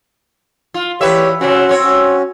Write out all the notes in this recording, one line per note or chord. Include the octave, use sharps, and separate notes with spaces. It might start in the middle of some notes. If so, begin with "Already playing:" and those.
F4
E2 G4 B4 C#5 E5
C#3 C4 C#4 F#4 F#5
C4 C#5
C#4 F#4